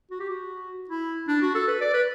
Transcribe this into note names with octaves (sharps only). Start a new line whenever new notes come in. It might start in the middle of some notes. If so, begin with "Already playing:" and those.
F#4
G4
F#4
E4
D4
F#4
A4
B4
D5
B4